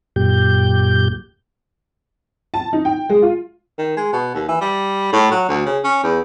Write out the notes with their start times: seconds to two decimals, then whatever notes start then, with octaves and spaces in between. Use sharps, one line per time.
0.16 F#2 A#2 G4 G6
2.54 A5
2.73 D#4
2.85 G5
3.09 G#3
3.22 F4
3.78 D#3
3.97 G#3
4.13 B2
4.34 D#2
4.48 E3
4.61 G3
5.12 A2
5.32 F#3
5.49 D2
5.66 C#3
5.84 C#4
6.03 E2